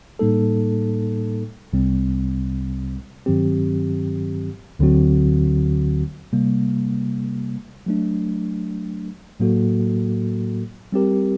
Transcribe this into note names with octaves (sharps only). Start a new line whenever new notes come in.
A2 G3 A#3 D#4 A4
C2 C3 G3 C4
G2 D#3 F#3 C4 G4
D2 D3 F#3 C4 F#4
C3 G3 A#3
F#3 A3 D4
A2 F#3 A#3 F#4 A4
G3 C4 G4 A#4